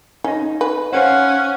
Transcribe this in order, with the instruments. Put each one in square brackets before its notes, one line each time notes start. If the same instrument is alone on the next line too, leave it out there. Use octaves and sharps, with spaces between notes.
[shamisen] C#4 [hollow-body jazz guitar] D#4 D#5
[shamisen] B4
[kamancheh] C#4 [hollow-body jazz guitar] C5 C#5 F5 [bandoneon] F#5